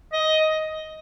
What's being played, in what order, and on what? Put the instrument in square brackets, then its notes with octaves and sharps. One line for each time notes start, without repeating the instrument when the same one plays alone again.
[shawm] D#5